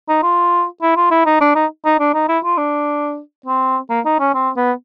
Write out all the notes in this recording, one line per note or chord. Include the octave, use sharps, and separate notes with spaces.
D#4
F4
E4
F4
E4
D#4
D4
D#4
D#4
D4
D#4
E4
F4
D4
C4
A#3
D#4
C#4
C4
B3